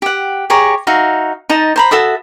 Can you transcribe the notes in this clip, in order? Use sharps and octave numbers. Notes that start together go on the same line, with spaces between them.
G4 F#5
G4 G#4 C#5 A#5
D#4 F#4 E5 F5
D#4 D#5 A5
C5 A#5 B5
F#4 A4 E5 D#6